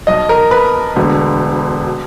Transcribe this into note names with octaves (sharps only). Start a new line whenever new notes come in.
B1 B2 D#5
A#4
B4
E1 D2 D3
B2